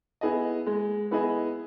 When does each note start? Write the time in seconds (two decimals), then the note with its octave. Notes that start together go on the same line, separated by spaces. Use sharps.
0.21 B3 E4 G#4 D#5
0.67 G#3
1.11 B3 E4 G#4 D#5